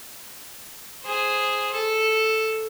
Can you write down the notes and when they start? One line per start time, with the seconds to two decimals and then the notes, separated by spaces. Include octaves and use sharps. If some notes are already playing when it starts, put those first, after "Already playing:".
1.03 G#4 C5
1.74 A4